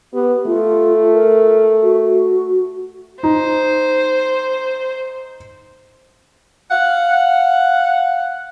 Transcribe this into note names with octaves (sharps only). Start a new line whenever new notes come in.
B3 G4
A3 F4
A#4
F#4
D#4 C5
F5 F#5